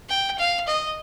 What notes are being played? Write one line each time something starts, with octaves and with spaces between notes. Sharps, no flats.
G5
F5
D#5